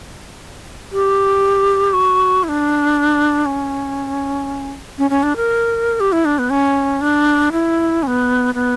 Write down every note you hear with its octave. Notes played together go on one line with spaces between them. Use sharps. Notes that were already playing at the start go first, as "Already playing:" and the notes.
G4
F#4
E4
D4
C#4
C#4
C#4
D4
A#4
G4
E4
D4
B3
C#4
D4
E4
C#4
B3
B3